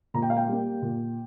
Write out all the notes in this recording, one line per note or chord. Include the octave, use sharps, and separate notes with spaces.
A#2 A#5
G5
F5
G5
G3 A#3
A#2